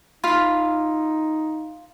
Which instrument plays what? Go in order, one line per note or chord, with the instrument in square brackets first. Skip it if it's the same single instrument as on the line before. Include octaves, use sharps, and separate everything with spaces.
[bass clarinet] D#4 [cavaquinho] F4 F5 B5